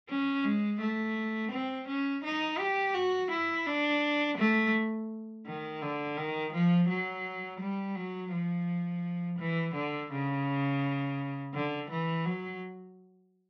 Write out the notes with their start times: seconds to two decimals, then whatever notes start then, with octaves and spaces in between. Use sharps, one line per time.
0.09 C#4
0.44 G#3
0.80 A3
1.52 C4
1.88 C#4
2.24 D#4
2.59 G4
2.94 F#4
3.31 E4
3.66 D4
4.38 A3
5.46 D#3
5.82 D3
6.17 D#3
6.53 F3
6.89 F#3
7.60 G3
7.95 F#3
8.32 F3
9.39 E3
9.75 D3
10.11 C#3
11.54 D3
11.90 E3
12.25 F#3